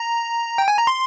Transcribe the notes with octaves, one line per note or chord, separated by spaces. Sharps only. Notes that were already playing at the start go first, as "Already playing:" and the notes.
Already playing: A#5
G5
G#5
A#5
C6